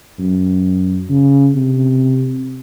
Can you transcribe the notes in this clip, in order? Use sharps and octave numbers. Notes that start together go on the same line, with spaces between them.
F#2
C#3
C3